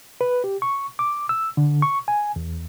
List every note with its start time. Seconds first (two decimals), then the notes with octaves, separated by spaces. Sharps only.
0.21 B4
0.44 G4
0.62 C#6
0.99 D6
1.29 E6
1.57 D3
1.82 C#6
2.08 G#5
2.36 E2